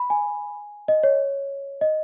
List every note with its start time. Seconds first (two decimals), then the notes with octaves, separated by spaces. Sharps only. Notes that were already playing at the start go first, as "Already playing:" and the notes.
Already playing: B5
0.10 G#5
0.88 D#5
1.03 C#5
1.81 D#5